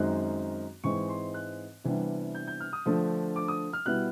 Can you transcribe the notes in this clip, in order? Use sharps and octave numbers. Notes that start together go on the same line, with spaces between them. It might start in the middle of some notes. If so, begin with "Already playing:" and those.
Already playing: F#2 D#3 G#3 C4 F#6
G#2 E3 G#3 C4 C#6
C6
F#6
C3 E3 G3 B3 D4
G6
G6
F6
D#6
D3 F3 A3 D4
D6
D#6
F6
B2 G3 B3 E4 F#6